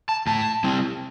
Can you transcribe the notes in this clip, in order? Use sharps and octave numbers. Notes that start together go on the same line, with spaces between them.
A5
A2 A5
G3 C4 E4